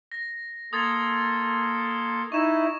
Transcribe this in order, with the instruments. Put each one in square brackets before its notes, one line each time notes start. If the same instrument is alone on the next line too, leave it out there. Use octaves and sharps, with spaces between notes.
[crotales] A#6
[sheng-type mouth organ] A#3 A4 C6 [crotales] D#6 G#6 A6
[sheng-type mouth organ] D#4 E4 [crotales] C#6 E7